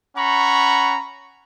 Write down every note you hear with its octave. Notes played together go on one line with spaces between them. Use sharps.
C#4 F#5 A#5 B5 C#6